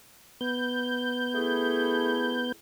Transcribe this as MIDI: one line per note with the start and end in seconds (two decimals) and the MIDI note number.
0.41 2.52 59
0.41 2.52 91
1.34 2.55 57
1.34 2.55 64
1.34 2.55 68